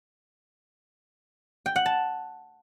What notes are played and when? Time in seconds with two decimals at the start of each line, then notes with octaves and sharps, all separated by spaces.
1.66 G5
1.76 F#5
1.86 A5